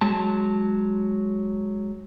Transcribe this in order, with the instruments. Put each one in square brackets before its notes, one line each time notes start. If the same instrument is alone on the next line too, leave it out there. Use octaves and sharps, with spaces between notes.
[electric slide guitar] F#3 G#3 A5